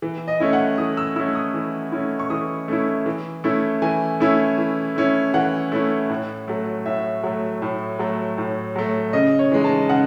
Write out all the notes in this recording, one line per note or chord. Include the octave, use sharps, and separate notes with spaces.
E3
D#5
A3 C#4 E4
F#5
E3 D#6
E6
A3 C#4 E4 E6
D#6
E3
A3 C#4 E4
C#6
E3 D#6
A3 C#4 E4
E3
A3 C#4 E4
E3 G#5
A3 C#4 E4
E3
A3 C#4 E4
E3 F#5
A3 C#4 E4
A2
F#3 A3
A2 E5
F#3 A3
A2
F#3 A3
A2
F#3 A3
C#3 D#5
C#5
E3 G#3 D#4
A5
C#3 F#5